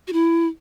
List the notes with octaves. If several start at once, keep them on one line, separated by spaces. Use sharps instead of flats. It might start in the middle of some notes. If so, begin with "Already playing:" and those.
F#4
E4